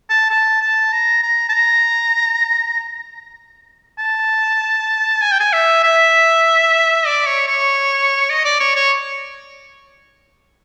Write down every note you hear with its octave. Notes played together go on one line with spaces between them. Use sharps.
A5
A5
A5
A#5
A#5
A5
A#5
A5
G#5
G5
G#5
E5
E5
D5
C#5
C#5
D#5
D5
C#5
C#5